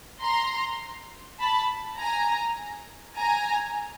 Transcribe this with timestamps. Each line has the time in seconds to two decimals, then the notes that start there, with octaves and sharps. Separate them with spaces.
0.22 A#5 C6
1.40 A5 B5
1.99 G#5 A#5
3.17 G#5 A#5